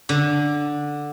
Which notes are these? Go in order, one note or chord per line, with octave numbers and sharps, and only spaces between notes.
D3